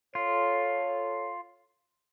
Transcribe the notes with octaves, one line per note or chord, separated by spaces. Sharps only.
F4 A4 C#5